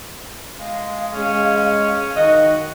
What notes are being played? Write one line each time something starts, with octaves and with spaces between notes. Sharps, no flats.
G#3 F5
G#3 C#4
D#3 F#4 D#5